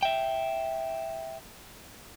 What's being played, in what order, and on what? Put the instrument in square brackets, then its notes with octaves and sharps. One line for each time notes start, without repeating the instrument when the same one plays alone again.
[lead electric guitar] E5 G5